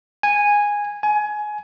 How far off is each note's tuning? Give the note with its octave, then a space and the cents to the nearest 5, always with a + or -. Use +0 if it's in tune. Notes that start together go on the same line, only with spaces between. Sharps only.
G#5 -10
G#5 +20